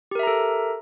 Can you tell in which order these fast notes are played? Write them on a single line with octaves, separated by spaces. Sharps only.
G4 A#4 E5 A#5 A4